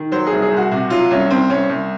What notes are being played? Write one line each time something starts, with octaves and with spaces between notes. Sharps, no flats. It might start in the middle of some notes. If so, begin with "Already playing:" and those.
Already playing: D#3
F#3 C5
G#4
C2
G#4
C2
F#4
C3 F#4
F#3 F4
C2 C#4
C2 C4
C2 C#4
C2